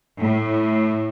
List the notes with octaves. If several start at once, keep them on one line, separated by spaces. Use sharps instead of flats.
A2